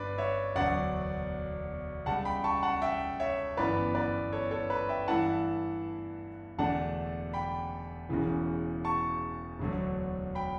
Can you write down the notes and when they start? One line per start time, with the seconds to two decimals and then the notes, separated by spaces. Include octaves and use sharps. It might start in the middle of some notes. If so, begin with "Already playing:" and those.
Already playing: G1 G2 G3 D4 B4 D5
0.18 C#5 E5
0.56 E1 D2 D3 F#3 D5 F#5
2.06 C#2 C#3 G3 F#5 A5
2.25 G5 B5
2.44 A5 C#6
2.63 F#5 A5
2.82 E5 G5
3.20 C#5 E5
3.57 G1 F#2 E3 B3 B4 D5
3.95 B4 D5
4.32 A4 C#5
4.51 A4 C#5
4.70 B4
4.89 E5 G5
5.08 G2 E3 A3 E4 F#5 A5
6.58 E1 E2 D3 A3 D4 F#5 A5
7.33 G5 B5
8.09 E1 E2 C#3 E3
8.85 A5 C#6
9.59 E1 D2 D3 F#3 A3
10.35 G5 B5